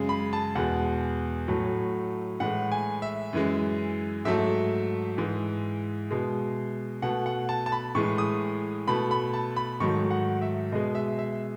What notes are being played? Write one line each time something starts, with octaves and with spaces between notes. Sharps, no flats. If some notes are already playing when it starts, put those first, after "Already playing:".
Already playing: F#2 C#3 G#3
B5
A5
E2 B2 G#3 F#5
A2 F#3 A3
A2 E3 G#3 F#5
G#5
E5
F#2 E3 G#3
G#2 F#3 A3 E5
G#2 E3 G#3
B2 G#3
B2 A3 F#5
F#5
A5
A5
B5
A2 E3 G#3 C#6
D#6
B2 A3 B5
B5
A5
B5
G#2 D#3 F#3 A3 C#6
F#5
E5
B2 G#3 D#5
E5
E5